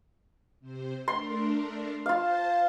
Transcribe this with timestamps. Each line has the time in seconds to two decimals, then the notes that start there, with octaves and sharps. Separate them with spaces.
0.60 C3 C5
1.08 A3 D4 A#4 C6
2.06 F4 C5 F5 A5